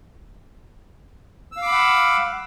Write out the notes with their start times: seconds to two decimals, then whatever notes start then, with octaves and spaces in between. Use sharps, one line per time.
1.52 E6
1.57 F5
1.62 D6
1.67 B5
1.72 F#5